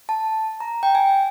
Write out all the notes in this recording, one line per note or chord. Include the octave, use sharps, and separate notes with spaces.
A5
A#5
G5
G#5